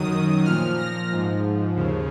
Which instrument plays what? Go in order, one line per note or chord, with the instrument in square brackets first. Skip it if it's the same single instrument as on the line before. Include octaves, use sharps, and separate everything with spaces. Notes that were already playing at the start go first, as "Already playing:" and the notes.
Already playing: [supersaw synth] F#2 D#3 F#3 D#6
A#2 F3 F6
A#6
G#2 F3
D#2 C#3 F3